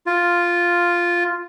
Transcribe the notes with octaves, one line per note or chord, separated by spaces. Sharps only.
F4